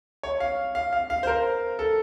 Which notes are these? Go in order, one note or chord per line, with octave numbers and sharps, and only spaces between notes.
C#5
F5
F5
F5
F5
C5
A#4
A4